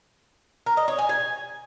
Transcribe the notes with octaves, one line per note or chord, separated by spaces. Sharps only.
A#4
D#5
C#5
G#5
G#5